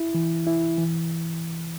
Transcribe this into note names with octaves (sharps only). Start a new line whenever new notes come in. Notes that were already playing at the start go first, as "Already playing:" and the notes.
Already playing: E4
E3
E4
E3